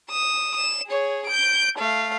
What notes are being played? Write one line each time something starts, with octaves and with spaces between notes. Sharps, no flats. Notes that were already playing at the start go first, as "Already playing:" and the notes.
D#6 E7
E7
G#4 C#5
G6 D7
A3 F5